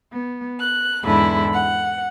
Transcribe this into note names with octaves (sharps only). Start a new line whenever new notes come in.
B3
F#6
E2 G#2 D3 E4 B5
F#5